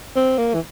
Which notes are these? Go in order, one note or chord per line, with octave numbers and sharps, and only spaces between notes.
C4
A#3
E3